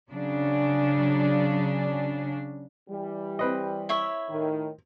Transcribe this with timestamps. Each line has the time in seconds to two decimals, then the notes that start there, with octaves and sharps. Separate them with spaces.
0.11 C#3 F#3 C#4 D4
2.90 E3 G3
3.39 C4 B4 D#5
3.89 E4 C#5 E5
4.29 A2 D#3